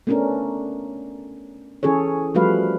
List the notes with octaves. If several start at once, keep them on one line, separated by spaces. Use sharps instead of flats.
A3 B3 C#4 D4 A#4
E3 C#4 G#4 A4 C#5
F3 G3 A3 F#4 B4 F5